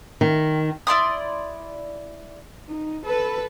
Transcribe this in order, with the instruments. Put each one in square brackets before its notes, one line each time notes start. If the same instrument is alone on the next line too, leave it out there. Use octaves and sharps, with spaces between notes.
[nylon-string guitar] D#3
[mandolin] E4 D5 C6 D#6
[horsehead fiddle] D#4
[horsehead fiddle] A4 [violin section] B4